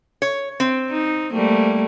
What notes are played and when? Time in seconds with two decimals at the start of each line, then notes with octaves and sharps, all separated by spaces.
0.22 C#5
0.60 C4
0.91 D#4
1.33 G3 A3 A#3